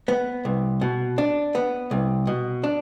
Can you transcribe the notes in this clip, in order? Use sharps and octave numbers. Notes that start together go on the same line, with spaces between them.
B3
C2
B2
D4
B3
C2
B2
D4